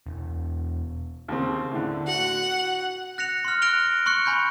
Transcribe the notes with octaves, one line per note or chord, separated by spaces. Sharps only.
E1
D#2 C#3 C4
A2 D3
F#4 F#5
F#6 A#6 C#7 F7
C6 F6
F6 F#6 A#6 D7 F7 G7
C6 C#6 F#6 C#7
G#5 B5 C#6 G6